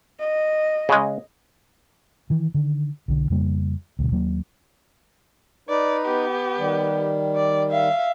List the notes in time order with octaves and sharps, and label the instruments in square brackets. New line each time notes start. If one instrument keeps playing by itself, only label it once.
[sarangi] D#5
[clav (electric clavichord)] C#3 G#3
[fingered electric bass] D#3 E3
D3 D#3
B1 D3
F2 C#3 G3 A#3
D2 G2 B2
D#2 F#3 A#3
[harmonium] D#4 B4 [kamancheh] D5
[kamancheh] B3 G4
[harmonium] D#3 G3
[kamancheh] D5
E5 F5